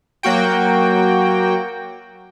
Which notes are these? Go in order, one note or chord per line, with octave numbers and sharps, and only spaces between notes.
F#3 A#3 F#4 G5